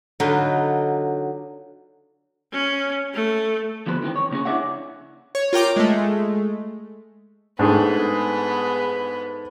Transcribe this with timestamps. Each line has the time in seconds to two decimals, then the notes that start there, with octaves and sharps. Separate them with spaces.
0.20 D3 F#3 D#4 F4 B4
2.52 C#4
3.14 A3
3.87 D2 F3 B3 B4 C5
4.02 D#3 E3 G3 C4
4.16 C#5
4.31 C#3 A#3 C#4 G#4
4.45 D4 E4 C#5 D5 E5 F#5
5.35 C#5
5.53 F4 A#4 G5 D6
5.76 G#3 A3
7.59 G#2 A3 B3 D4 G#4 G5